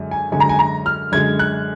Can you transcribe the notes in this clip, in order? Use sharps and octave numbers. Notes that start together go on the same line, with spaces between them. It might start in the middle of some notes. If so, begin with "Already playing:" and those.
Already playing: F#2 D3 G#3
G#5
F#2 D3 G#3 G#5
A#5
G#5
A#5
F6
F#2 D3 G#3 G#6
F#6